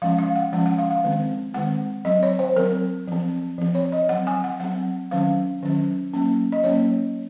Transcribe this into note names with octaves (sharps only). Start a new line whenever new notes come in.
F3 G#3 C#4 F5
F5
F#5
F3 G#3 C#4 F#5
F#5
F5
F5
D#3 G#3 C4
D#3 G#3 C4 F#5
F#3 C4 D#5
C#5
C5
F#3 C4 A#4
F3 C4
F3 C4
C#5
D#5
F#3 C4 F#5
G#5
F#5
F#3 C4 F#5
D#3 F#3 C#4 F5
D#3 F#3 C#4
F#3 A#3 C#4
D#5
F#3 A#3 C#4 C#5